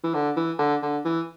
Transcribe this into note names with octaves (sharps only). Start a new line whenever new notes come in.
E3
D3
E3
D3
D3
E3